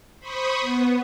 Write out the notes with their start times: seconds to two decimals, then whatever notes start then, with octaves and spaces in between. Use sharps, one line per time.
0.19 C5 B5 C#6 D#6
0.61 B3